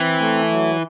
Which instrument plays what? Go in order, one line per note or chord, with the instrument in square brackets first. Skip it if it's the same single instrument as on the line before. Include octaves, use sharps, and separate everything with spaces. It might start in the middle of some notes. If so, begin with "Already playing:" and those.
Already playing: [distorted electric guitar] E3 [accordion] C4
[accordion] A3
F#3